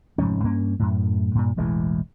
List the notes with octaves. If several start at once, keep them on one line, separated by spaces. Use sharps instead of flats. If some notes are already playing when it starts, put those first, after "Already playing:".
F1 G#2 F3 C#4
G2 A#3 C#4
F#2 A2
G2 A#2
E1 A1 E3 G#3